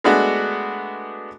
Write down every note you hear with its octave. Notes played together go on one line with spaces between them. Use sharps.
G#3 A3 B3 D4 F#4